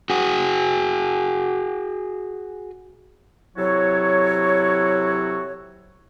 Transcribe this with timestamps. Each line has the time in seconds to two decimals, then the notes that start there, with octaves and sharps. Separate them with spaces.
0.10 F#4 G#4
3.57 C3 F#3 E4 F#4 A4 C#5